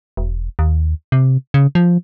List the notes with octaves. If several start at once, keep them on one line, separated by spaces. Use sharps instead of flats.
E1
D#2
C3
C#3
F3